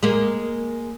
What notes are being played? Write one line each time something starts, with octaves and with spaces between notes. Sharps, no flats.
G#3 A#3